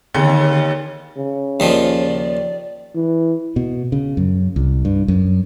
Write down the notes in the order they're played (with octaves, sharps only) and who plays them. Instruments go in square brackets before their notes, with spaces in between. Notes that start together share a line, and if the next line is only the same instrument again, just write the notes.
[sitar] D#2 [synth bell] D3 D#3 A6
[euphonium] C#3
[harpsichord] D#2 D#3 F3 [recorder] D5
[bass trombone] E3
[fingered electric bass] B2
C#3
F#2
C2
G2
F#2